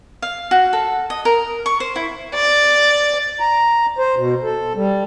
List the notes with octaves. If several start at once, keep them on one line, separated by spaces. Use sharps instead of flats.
F5
F#4
A4
D#5
A#4
C#6
C5
E4
D5
A#5
C5
B2
A4
G3